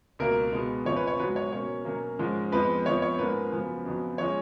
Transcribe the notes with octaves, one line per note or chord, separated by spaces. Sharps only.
C#2 B2 A#3 A#4
B2 G#3 B3
F2 C#3 F3 C#5
B4
C#5
G#2 F#3 B3 B4
C#5
B2 A#3 C#4 C#5
B2 F#3 A#3 C#4
G#2 F3 G#3 C#4
F2 F3 G#3 B3 B4
F2 F3 B3 C#5
C#5
G#2 F3 A#3 C#4 B4
F#2 C#3 F3 B3
F2 C#3 F#3 B3
F3 G#3 C#4 C#5